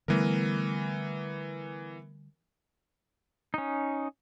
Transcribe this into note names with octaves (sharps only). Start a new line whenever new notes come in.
D3 E3 G3 A3 B3 A#4
C#4 D#4